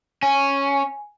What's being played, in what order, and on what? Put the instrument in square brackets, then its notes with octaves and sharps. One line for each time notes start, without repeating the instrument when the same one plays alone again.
[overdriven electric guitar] C#4 [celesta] G#5